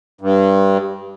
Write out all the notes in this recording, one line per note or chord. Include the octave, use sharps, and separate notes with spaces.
G2